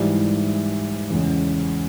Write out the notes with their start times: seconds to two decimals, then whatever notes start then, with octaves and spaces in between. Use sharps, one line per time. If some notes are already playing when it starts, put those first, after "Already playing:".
Already playing: G#2 E3 G3
1.10 E2 C#3 G#3 C#4